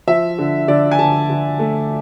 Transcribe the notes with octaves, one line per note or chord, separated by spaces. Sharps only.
F3 E5
D3
D3 D5
G#5
D3 A5
D3
A3